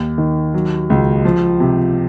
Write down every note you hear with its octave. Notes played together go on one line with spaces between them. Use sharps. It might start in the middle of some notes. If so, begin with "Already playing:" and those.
Already playing: D#2
D#3
F#3
C#2
F3
C3